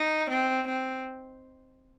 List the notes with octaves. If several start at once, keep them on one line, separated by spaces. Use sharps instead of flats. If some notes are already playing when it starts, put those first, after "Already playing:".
Already playing: D#4
C4
C4